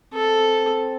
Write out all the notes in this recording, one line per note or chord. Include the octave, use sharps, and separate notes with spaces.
C4 A4